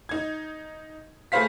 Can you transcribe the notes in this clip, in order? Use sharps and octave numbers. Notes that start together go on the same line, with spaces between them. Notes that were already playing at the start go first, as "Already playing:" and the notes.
D#4 G#6
A3 G#4 B4 C5 F5 B6